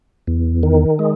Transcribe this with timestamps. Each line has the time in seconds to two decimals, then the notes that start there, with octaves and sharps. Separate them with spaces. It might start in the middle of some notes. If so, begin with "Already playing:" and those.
0.27 E2
0.63 D#3
0.99 G#3